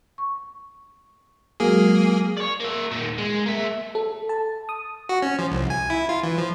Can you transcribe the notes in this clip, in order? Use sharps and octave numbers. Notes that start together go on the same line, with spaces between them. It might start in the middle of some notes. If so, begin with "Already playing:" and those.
C#6
F#3 G#3 A#3 F#4 G#4
C#5 D5
A#3 E5
A#2 D#3
G#3
A#3 E5
A4
A5
D#6
F#4
C#4
F3
C2
G#5
E4
F4
E3
F3